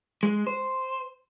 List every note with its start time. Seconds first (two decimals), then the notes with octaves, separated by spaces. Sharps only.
0.23 G#3
0.47 C5